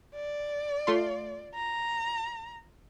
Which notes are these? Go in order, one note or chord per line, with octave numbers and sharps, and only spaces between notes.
D5
A3 F4 C6
A#5